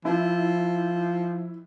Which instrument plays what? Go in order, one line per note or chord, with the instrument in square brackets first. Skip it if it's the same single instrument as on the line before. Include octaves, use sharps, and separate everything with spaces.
[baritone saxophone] F3 [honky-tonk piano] E4